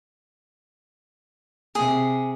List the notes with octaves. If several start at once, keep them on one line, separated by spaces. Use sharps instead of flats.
C3 G#4